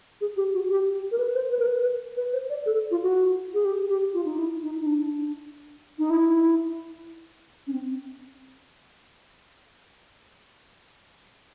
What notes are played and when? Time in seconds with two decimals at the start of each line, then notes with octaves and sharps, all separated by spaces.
0.21 G#4
0.37 G4
0.54 F#4
0.70 G4
1.11 A#4
1.18 B4
1.35 C5
1.51 B4
1.59 A#4
1.66 B4
2.17 B4
2.33 C5
2.50 D5
2.66 A4
2.91 F4
3.02 F#4
3.54 G#4
3.65 G4
3.88 G4
4.14 F4
4.25 D#4
4.38 E4
4.63 D#4
4.80 D#4
4.86 D4
5.99 D#4
6.10 E4
7.67 C#4
7.73 C4